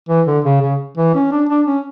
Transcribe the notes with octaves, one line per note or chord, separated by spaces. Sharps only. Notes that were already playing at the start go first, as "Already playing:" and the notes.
E3
D3
C#3
C#3
E3
C#4
D4
D4
C#4